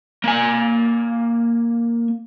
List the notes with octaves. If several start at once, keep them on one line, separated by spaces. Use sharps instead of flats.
A#3 G#5